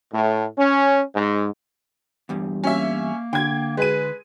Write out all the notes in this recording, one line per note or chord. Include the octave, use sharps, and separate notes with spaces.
A2
C#4
G#2
E2 G2 G3
A#3 C#4 E5
D3 G5 G#6
G#3 B4 D#7